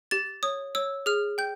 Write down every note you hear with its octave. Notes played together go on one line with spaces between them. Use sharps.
G4 A6
C#5 D#6
C#5 E6
G#4 F6
G5 G6